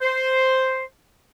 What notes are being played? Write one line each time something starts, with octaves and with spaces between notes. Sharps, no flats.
C5